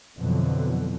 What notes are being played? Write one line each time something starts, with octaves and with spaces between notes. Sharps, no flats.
F2 B2 D3 E3 F#3